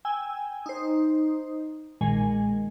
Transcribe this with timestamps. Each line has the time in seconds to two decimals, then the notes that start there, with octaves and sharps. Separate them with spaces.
0.05 G5 G#5 E6
0.66 D#4 C5
2.01 B1 A#2 D#3 G#3 G#5